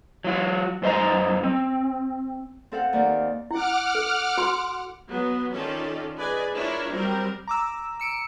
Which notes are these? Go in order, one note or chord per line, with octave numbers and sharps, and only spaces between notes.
F#3 F4 F#4
F#2 C5 D#5 A#5
C4
C4 A4 F5 F#5
D#2 A#3 D5
E4 F#5 D6 F6
A4
F#4 B5 C6
F#3 B3
D#3 C#4 F4 A4 D5
G#4 B4 D5 D#5 G#5
D4 E4 F4 A#4 C#5 D5
F#3 G3 C4 A#4
A#5 D6 E6
E6 C#7 D7